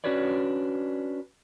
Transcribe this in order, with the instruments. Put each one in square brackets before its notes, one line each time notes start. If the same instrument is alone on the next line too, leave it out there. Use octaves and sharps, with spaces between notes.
[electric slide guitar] C#4 D4 F#4 B4 C#5 D5